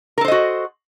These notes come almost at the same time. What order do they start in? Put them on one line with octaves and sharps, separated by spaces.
A#4 A4 C5 D#5 F#4